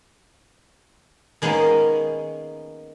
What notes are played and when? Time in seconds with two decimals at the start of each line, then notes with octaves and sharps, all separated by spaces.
1.42 D#3 G#3 A#3 B3 C#4 D#4